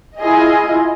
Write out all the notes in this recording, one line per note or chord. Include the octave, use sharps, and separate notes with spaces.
E4 F4 G#4 D#5